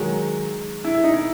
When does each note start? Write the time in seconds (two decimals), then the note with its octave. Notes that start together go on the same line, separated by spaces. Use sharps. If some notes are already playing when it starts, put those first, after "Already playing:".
Already playing: D#3 F#3 G#3
0.84 E4
0.95 E4
1.04 D#4
1.14 E4